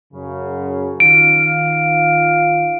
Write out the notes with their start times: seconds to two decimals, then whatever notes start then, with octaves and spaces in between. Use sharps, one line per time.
0.14 F#2 C#3
1.00 D#3 F4 F5 D7